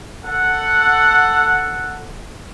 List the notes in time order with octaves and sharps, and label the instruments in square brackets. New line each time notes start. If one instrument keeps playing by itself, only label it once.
[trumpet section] A4 F#5